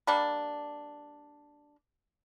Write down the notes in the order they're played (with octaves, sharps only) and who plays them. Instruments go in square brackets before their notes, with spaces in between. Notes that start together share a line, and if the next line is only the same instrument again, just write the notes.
[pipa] G3 A#3 D4